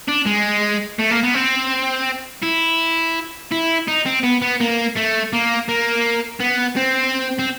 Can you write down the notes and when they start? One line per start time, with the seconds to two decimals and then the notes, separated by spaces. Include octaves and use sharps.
0.08 D4
0.26 G#3
0.99 A3
1.10 A#3
1.23 B3
1.34 C4
2.43 E4
3.52 E4
3.88 D#4
4.06 C4
4.24 B3
4.42 B3
4.60 A#3
4.96 A3
5.33 A#3
5.69 A#3
6.40 B3
6.77 C4
7.39 C4